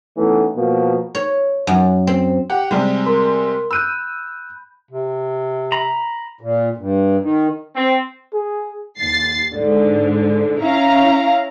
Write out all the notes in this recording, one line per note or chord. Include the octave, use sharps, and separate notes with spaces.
E3 A3 B3 C#4 D#4
B2 F3 A#3
C#5
F#2
C4
G4 F#5
C3 G3 G#3
A#4 C6
B5 E6 F#6 G6 D#7
C3
A#5 B5
A#2
G2
D#3
C4
G#4
D#2 A6 C7
G#2 D3
C#4 E4 F5 A#5